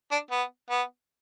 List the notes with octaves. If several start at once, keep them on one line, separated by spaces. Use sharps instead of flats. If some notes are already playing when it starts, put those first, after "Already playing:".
D4
B3
B3